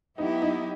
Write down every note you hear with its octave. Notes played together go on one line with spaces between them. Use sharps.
F#3 B3 D#4 E4 G4
D#4